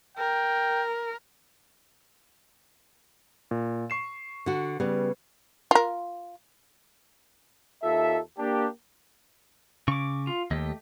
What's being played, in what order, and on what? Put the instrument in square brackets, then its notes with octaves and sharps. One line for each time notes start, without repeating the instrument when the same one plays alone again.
[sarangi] A#4 [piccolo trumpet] G5
[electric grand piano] A#2
C#6 C7 E7
[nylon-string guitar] D3 F#4
[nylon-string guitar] C#3 B3 [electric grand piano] G3
[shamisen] F4 A#4
[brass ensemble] D#2 F4 A4 E5
A#3 D4 G4
[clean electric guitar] C#3 [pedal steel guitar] C#6 D6
[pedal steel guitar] F4
[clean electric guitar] D#2 [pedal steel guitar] A3 G4 D#5